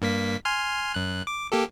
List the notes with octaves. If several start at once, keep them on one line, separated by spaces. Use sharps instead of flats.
G2 A#3 B6
G#5 C6 F6
F#2 F#6
D6
A#3 G4 A4